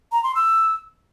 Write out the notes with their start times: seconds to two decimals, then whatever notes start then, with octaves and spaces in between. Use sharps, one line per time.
0.12 A#5
0.24 C6
0.35 E6